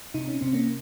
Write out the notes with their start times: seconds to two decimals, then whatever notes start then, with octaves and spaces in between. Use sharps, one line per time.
0.14 C3 D#4
0.28 C#4
0.41 C3 C4
0.53 A#3 C#4